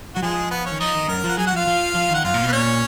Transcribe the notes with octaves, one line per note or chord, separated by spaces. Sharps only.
F#3 F#4
F3 G#3 G#4
B3 B4
C#4 C#5
D#3
F3 D#4 D#5
D#3
F#2 A#4 A#5
F3
F#5
F#3 G#4 G#5
F#4 F#5
F3 F4 F5
F3
F3
D#3 F#5
F#2 F4 F5
A#2
B2
B4
A#2 C#4 C#5